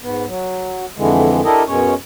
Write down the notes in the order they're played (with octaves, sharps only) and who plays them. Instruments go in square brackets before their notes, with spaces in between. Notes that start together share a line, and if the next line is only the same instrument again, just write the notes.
[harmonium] G#2 B3
F#3
F2 D3 E3 G#3
D4 E4 G4 A4 A#4 D#5
F#2 B2 G#3 C#4 C#5